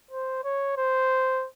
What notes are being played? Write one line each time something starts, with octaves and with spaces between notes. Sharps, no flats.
C5
C#5
C5